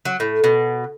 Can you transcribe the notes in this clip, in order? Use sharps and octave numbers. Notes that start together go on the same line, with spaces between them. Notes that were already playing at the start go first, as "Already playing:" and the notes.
F#3
A2
B2